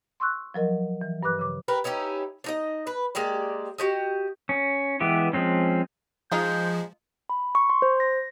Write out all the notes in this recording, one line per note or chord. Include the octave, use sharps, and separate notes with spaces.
C6 C#6 E6 F#6
F3 F#3 A#4 D#5
E3
G2 B4 D6 F#6
C#3 D6
G4 A#4 B4
C#4 D#4 E4 G4
D4 D#4 D#5
B4
G#3 A#3 G4 D5
F#4 G4 D#5
C#4
E3 G#3 B3 G4
F3 G#3 C4 C#4
F3 G#3 D#4 F4 G#4 G6
B5
C#6
C6
C5
A#6